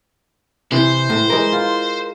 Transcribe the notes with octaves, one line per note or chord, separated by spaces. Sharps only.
C3 E3 C5
A2
E3 G#3 A#4
F4